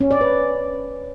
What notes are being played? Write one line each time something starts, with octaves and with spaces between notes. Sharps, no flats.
C#4
D5
B4